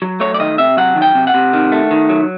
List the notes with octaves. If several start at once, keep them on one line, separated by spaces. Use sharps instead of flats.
F#3
A3 C#5
D5
D#3 D#5
C3 E5
F#3 F#5
D#3
G5
C3
F#5
C3
D#3
A3
D#3
F#3